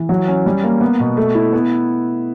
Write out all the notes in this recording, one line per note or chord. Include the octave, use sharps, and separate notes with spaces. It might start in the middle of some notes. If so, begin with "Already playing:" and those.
Already playing: E3
F#3
C#4
G3
A#3
B3
B2
A3
E4
B3